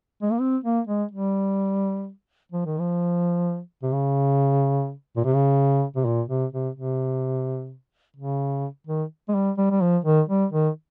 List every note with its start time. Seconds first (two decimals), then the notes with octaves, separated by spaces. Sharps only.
0.22 G#3
0.32 A#3
0.41 C4
0.64 A#3
0.87 G#3
1.12 G3
2.52 F3
2.66 D#3
2.80 F3
3.83 C3
3.93 C#3
5.16 A#2
5.25 C3
5.34 C#3
5.96 C3
6.05 A#2
6.29 C3
6.53 C3
6.75 C3
8.17 C#3
8.87 D#3
9.28 G#3
9.34 G3
9.58 G3
9.71 G3
9.81 F3
10.05 D#3
10.29 G3
10.52 D#3